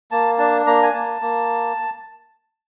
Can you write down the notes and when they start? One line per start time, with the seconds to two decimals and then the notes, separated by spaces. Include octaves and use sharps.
0.11 A#3 A5
0.38 D4 A5
0.66 A#3 A#5
0.83 G#5
0.94 A#3 A5
1.22 A#3